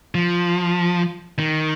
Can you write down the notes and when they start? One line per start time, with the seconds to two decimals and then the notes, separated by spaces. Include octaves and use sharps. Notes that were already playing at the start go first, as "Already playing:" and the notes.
0.15 F3
1.39 D#3